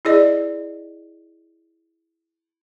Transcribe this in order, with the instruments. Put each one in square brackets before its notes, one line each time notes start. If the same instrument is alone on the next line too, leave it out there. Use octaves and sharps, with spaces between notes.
[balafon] E4 G#4 D5 D#5